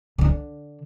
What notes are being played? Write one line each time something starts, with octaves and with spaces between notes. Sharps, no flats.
D3 D4